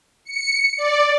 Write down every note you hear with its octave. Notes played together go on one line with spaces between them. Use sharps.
C#7
D5